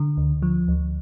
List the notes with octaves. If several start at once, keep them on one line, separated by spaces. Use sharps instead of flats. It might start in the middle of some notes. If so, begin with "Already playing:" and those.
Already playing: D3
D2
F3
D2